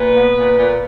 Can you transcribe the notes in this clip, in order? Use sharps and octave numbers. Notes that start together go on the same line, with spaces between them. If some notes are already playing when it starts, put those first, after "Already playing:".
Already playing: A#2 B4
B3
A#2
A#2